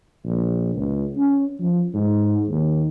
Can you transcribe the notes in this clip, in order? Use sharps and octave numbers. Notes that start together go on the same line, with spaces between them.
A#1
C#2
C#4
F3
G#2
D#2